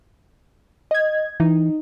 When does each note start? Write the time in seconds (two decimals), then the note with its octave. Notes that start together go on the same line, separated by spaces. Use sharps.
0.91 D#5 G#6
1.40 E3 D#4